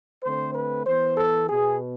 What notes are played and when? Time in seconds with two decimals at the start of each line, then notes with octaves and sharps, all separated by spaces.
0.23 D3 A3 C4 C5
0.55 B4
0.87 E3 B3 C5
1.17 A4
1.49 B2 B3 G#4